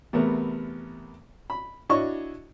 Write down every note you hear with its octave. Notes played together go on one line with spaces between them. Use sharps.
E2 C3 A3 B3 A#4
B5
D4 E4 F#4 C#5 D#5 C#6